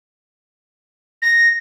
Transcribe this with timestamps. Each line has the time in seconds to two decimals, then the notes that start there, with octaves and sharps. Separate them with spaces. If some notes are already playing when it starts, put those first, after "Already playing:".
1.22 A#6